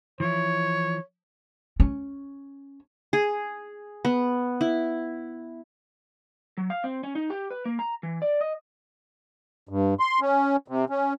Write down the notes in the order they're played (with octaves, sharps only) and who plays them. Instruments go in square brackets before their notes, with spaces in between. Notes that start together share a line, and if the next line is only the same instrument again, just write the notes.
[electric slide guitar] E3 F3 E4 [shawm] C#5
[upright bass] C#4
[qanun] G#4
B3
E4
[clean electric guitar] F#3
F5
C4
C#4
D#4
G4
B4
A#3
A#5
E3
D5
D#5
[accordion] G2
C6
C#4
C3
C#4